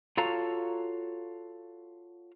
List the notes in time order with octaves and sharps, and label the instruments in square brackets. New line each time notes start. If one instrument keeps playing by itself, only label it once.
[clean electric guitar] F4 F#4 A4 C#5 F5 A#5